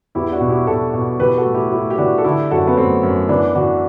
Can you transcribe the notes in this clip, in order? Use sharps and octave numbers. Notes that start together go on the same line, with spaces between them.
E2 E4 G4
D4 F#4
B2
E4 G4
B2 F#4 A4
B2
E3 G4 B4
F#4 A4
A2
E4 G4
A2 E4 G4
G4
E3 D4 F#4
A4
D3 E4 G4
F#2 F#4 A4
B3
F#2 A3 C4
F#2
E3 B3 D4
E3 D4 F#4